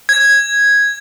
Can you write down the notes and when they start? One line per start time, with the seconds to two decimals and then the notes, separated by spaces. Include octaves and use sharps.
0.09 G#6